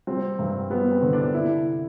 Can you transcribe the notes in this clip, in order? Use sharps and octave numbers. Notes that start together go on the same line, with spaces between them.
G3 C4
G2
G3 B3
C4
D3
D4
C3 E4